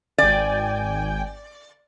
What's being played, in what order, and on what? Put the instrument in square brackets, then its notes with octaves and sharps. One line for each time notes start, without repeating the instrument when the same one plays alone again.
[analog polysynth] G#1 G5 G#5 [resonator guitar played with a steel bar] D5